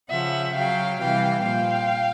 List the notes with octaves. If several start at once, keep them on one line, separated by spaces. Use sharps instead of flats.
C#3 F3 E5 F#5
C#3 F#3 F5 G5
C3 E3 G3 F5 G5
A#2 F3 F5 G5